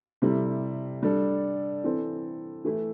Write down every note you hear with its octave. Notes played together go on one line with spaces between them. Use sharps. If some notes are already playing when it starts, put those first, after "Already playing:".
C3 G3 E4 A4
G3 D4 A4
E3 C4 A4
E3 A3 E4 A4